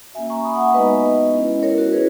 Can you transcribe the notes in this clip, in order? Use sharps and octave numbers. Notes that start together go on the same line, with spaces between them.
A#3 C#4 F#4 E5 G#5
A#5 C#6
B5 D#6
F#5
E5 G#5
G#3 B3 D#4 F#4 B4 D#5
G#3 C#4 E4
A#4 C#5
F#4 A#4
C#4 E4 G#4 B4